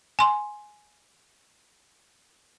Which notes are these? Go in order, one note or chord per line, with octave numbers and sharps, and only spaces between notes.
G#5 C6